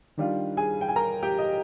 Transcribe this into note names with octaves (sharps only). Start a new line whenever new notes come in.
D#3 G3 D4 F4
G#4 G#5
G5
G#5
A#4 A#5
G4 G5
D#5